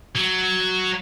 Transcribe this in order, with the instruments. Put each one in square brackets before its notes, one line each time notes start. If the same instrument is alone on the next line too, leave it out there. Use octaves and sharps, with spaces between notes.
[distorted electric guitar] F#3